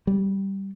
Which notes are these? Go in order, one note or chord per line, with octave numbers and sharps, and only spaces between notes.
G3